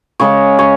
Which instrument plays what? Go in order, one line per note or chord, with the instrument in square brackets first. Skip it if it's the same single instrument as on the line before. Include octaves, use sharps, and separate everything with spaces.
[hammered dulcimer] C#3 G#3 C#4 C#5
C#5